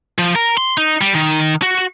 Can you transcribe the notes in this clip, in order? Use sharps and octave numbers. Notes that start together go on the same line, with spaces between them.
F3
A#4
C6
D#4
G3
D#3
F#4